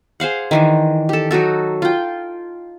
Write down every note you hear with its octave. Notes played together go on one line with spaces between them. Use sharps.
G#4 C5 F5 F#5
D#3 E3 D4
G4 A4
F#3 D#4 F#4 A4
F4 G5